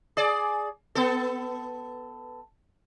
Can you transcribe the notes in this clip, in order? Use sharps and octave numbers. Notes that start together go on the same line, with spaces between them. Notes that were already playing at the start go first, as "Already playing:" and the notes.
G#4 D5
B3 A4